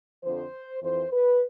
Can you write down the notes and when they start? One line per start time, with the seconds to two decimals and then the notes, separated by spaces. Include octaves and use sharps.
0.23 F2 D3 F3 C5
0.83 F2 E3 C5
1.12 B4